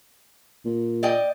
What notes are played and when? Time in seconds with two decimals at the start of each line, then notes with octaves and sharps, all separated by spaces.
0.65 A#2
1.03 D5 D#5 G5